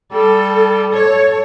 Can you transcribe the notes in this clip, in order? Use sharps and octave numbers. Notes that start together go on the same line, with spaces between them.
G3 A4
A4 C#5